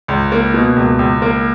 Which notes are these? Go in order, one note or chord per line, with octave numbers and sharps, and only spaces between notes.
C#2
A#3
B2
C#2
C#2
A#3